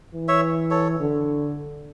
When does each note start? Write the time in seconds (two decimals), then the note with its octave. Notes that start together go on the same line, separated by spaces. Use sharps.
0.14 E3
0.28 C#5 E5
0.70 A4 C#5
1.00 D3